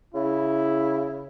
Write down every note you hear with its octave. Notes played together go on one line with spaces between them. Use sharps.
C#3 E4